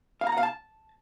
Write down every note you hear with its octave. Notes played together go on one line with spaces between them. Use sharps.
F5
A#5
F#5
F5
A5